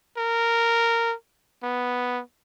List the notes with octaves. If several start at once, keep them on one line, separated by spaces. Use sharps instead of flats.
A#4
B3